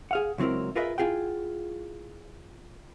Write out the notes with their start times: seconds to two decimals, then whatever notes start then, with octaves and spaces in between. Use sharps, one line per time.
0.11 G#4 F5 F#5
0.38 C#2 F#3 C4 E4 A#4
0.75 F4 G#4 A#4 B4 D#5 E5
0.98 E4 F4 G#4 F#5 G5